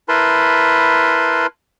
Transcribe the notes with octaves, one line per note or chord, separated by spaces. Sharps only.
E4 A#4 B4 A5 B5 C6